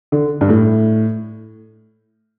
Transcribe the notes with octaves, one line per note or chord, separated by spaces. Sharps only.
D3
G2
A2